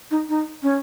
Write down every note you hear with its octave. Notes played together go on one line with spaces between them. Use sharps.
D#4
D#4
C#4